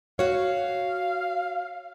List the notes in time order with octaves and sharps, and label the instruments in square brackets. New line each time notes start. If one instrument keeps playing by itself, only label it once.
[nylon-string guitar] F#4 C#5 [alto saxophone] F5